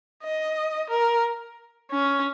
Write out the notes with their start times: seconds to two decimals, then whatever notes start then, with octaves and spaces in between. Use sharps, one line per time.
0.23 D#5
0.90 A#4
1.91 C#4